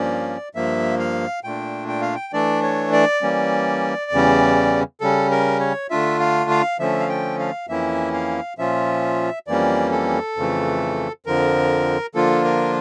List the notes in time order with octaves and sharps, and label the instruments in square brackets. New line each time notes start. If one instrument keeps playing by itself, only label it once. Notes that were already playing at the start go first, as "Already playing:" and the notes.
Already playing: [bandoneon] G2 F3 A#3 C#4 D5
G2 F3 A#3 E5
F5
A#2 A3 D4 G5
G5
F5
G5
E3 A3 D4 D5
C#5
D5
E3 G3 A#3 C#4
E2 C#3 E3 G3 C#4
C#3 G3 C#4 A4
A#4
C#5
D3 A3 D4 F4 E5
F5
F5
D3 F3 A3 C#4 E5
F5
G5
F5
F2 E3 A#3 C#4 E4 E5
F5
A#2 F3 C#4 F4 E5
F2 E3 G3 A#3 C#4 D5
A4
F2 C#3 E3 A3
F2 D3 F3 A#4
D3 F3 A#3 D4 F4 A4
A#4